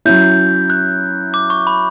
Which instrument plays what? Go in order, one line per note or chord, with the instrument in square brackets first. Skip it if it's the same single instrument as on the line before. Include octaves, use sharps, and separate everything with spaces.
[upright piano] F#3 C#4 E4 [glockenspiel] G6
[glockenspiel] F#6
D6
C#6
B5